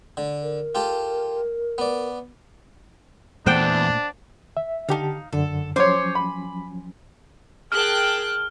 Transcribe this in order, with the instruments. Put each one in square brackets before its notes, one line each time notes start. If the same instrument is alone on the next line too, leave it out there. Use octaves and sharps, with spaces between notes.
[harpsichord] D3
[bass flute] A#4
[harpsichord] F4 G4 A4
B3 D5
[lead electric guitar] E2 [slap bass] A#2 A3 [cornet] D4 [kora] C5 F#5 G5
[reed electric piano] E5
[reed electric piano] D3 G4 A5 [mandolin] D#4 F5
[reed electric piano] F#2 D3 [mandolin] A4
[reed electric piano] F3 F#3 C#4 [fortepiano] C5 C#5 [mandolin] G#5 C6 D6
[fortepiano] B5
[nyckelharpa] G#4 A#4 [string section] G5 A5 F#6 [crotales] F6